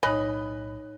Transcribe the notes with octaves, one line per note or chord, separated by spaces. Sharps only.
B1 A2 D#4 C#5 D#5 G#5 B5 F#6